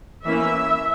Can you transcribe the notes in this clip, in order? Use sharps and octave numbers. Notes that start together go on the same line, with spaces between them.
E3 A#3 C#4 E5